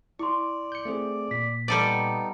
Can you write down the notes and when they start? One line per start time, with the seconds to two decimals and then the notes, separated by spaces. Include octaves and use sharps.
0.19 E4 D5 C6 C#6
0.72 G6 C#7
0.85 A3 C4 G#4
1.31 A#2 B6
1.68 G3 B3 D#4 A4 D5 A6 D#7